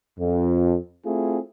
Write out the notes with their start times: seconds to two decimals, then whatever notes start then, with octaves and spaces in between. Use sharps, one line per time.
0.19 F2
1.05 A3 C4 E4 F4 G#4